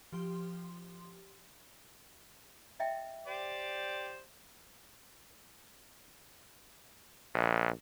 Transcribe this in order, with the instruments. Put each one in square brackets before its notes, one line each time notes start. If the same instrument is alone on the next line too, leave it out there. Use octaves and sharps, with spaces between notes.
[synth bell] F3 G4 C6
[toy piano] D#5 E5 G5
[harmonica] G4 C5 D5
[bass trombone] A#1